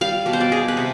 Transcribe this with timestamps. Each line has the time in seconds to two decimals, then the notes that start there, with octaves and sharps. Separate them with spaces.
0.01 G3 F5
0.26 B2 D5
0.33 C5
0.41 D5
0.52 G3 G#4
0.68 B4
0.77 C3